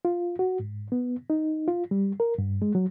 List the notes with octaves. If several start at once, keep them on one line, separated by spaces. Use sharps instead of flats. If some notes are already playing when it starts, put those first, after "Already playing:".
F4
F#4
G#2
B3
D#4
F4
G3
A#4
G2
G#3
F#3